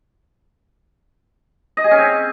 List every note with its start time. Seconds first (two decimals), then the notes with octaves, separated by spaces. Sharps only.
1.77 D#5
1.84 G#4
1.91 C#4
1.98 C4